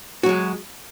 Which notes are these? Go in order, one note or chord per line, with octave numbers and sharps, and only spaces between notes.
F#3 G#3 F#4